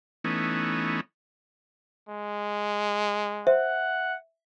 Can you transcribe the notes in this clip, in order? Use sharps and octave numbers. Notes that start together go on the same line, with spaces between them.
E3 A3 B3 C#4 D#4
G#3
C5 E5 F#5